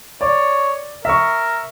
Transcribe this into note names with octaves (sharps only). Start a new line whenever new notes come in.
C#5 D5
A#4 E5 C#6